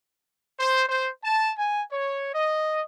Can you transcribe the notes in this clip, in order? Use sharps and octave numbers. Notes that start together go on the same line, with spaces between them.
C5
C5
A5
G#5
C#5
D#5